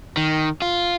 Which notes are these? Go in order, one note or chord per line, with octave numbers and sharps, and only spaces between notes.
D#3
F4